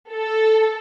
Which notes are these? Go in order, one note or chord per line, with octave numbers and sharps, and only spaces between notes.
A4